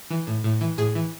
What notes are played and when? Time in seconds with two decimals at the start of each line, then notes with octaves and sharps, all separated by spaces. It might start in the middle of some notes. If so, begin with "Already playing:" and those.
0.10 E3
0.27 A2
0.44 A2
0.61 E3
0.78 A2 G#4
0.95 E3